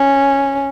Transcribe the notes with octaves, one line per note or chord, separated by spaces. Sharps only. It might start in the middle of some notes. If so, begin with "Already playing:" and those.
Already playing: C#4